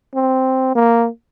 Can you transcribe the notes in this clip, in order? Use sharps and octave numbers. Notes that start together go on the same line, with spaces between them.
C4
A#3